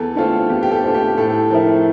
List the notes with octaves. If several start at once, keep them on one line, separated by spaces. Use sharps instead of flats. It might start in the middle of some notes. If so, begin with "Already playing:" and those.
Already playing: E2 A4
D3 A3 C4 F4
E2 G4
G4
A4
D3 A3 C4 F4
G4
A2 A4
F3 C4 E4 A#4